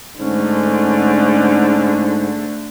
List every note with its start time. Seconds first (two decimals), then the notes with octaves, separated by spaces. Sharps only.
0.20 G#2 D3 A3 C#4